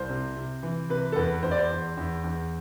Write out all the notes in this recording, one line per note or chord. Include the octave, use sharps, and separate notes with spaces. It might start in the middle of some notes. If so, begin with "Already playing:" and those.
Already playing: C2 C5
C3
C3
E3
C3 B4
A4
E2 B4
E2 C5
D5
C5
E2
E2
E2